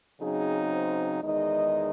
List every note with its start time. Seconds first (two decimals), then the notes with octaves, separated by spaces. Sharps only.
0.20 C#3 F#3 C4 D#4 G#4
0.72 C5
1.22 E2 D#3 G#3 D#4 D#5